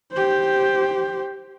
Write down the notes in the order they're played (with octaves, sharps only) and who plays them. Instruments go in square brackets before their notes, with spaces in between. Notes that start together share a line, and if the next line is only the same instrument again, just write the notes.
[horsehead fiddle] G4 C5